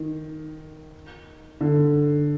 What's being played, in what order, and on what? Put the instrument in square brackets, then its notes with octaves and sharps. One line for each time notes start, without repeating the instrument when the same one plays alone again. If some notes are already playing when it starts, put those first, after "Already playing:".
Already playing: [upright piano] D#3
D3